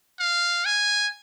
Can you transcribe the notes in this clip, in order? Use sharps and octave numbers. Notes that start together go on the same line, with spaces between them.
F5
G#5